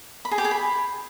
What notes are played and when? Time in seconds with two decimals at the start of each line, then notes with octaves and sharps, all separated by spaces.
0.25 B5
0.31 G#4
0.38 G4
0.45 G#4
0.51 B5